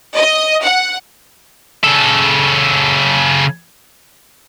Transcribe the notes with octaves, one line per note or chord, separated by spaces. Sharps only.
D#5
F#5
C#3 A4